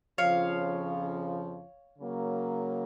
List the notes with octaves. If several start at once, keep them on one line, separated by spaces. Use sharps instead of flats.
F2 C#3 F3 C#5 F5
C#3 F#3 A#3